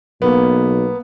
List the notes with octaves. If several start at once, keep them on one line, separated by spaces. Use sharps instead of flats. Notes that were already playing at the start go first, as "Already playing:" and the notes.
B1 A#3 B3